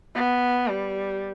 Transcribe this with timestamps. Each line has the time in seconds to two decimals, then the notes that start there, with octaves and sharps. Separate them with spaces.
0.15 B3
0.68 G3